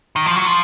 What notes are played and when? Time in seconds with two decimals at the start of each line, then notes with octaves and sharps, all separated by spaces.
0.16 D#3
0.26 F3
0.36 F#3
0.46 F3